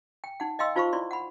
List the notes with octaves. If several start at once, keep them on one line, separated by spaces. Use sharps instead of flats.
G5
D#4 F#5
D#5 F5 G5 C6 E6
D#4 F4 C5 F5 B5 C#6
E4 D5 C6
F#5 B5